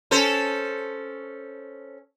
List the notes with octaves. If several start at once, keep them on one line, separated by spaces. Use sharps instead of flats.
C#4 A4 C5